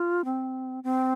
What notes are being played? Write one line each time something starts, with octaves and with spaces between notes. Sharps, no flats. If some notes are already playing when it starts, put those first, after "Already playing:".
Already playing: F4
C4
C4